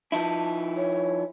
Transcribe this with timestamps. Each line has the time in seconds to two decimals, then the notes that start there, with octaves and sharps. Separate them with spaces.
0.12 F3 D#4 E4 A5
0.76 C#5